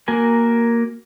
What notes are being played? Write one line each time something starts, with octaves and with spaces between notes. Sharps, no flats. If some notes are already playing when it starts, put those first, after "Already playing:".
A#3 F#4 A#4 G#5